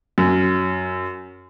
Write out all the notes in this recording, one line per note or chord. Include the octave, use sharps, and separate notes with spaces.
F#2